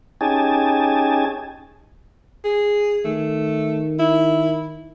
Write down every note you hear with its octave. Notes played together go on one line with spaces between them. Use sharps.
C#4 D#4 G4 G#4 G#5 A5
G#4
D#3 A3
E4